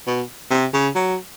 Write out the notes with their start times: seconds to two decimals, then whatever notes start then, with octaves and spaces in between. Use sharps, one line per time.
0.07 B2
0.50 C3
0.73 C#3
0.95 F#3